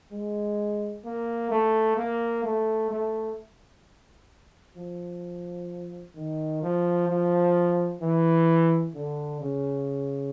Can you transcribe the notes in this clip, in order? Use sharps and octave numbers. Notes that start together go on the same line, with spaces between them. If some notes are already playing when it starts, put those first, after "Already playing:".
G#3
A#3
A3
A#3
A3
A3
F3
D#3
F3
F3
E3
D3
C#3